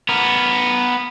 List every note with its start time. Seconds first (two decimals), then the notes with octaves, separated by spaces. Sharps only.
0.09 B3 A#4